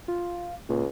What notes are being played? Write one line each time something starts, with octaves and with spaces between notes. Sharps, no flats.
F4
C#2 A#2